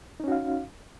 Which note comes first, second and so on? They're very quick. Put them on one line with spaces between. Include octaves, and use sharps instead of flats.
D#4 C#4 F#4 F5